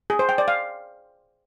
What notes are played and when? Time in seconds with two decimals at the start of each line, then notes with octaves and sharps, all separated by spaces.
0.10 G#4
0.19 C5
0.29 G5
0.38 D5
0.48 F5